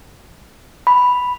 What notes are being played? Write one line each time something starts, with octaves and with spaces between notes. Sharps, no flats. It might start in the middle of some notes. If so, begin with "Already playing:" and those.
B5